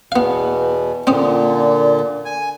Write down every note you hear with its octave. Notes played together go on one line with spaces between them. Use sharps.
E2 B2 B3 F5
A#2 D3 C4 C#4 D#6
G#5